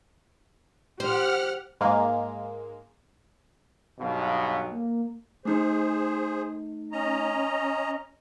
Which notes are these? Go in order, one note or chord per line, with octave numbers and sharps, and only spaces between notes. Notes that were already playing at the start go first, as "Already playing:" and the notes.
G4 C5 F#5 F6
G#2 G#3 A#3
B1 G2 B2 F5
A#3
A3 D#4 G#4 C5
C#4 D#5 A#5